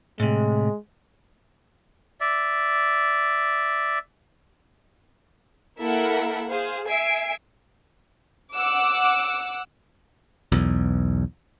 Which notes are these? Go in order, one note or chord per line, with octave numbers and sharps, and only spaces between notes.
A2 C3 G#3
D5 E5
A#3 E4 A4 A#4 E5 F#5
G#4 C5 F5
E5 G#5 C7 D7
F#5 D6 E6
B1 E2